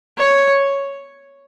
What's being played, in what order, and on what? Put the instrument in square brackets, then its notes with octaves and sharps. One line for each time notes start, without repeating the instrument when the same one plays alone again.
[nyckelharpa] C#5